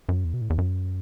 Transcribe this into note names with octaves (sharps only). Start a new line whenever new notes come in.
F#2
E2
B2
A2
E2
F#2